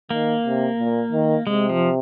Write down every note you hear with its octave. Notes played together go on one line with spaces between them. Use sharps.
D#3 A#3
C3
A#2
D#3
C3 G#3
F3